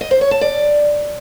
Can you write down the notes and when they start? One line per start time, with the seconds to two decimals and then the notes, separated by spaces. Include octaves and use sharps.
0.01 D#5
0.11 C5
0.21 C#5
0.31 A5
0.41 D5